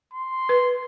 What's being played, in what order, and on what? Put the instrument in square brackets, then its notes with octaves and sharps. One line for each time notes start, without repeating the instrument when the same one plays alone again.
[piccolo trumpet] C6
[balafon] B4